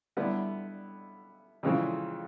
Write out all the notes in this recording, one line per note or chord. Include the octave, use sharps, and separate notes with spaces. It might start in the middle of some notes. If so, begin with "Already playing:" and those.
D3 G3 B3 E4
F2 C#3 E3 G#3 C4